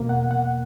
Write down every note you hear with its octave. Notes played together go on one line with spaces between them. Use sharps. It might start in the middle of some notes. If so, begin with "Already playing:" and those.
Already playing: E2 B2 A#3
F#5
F#5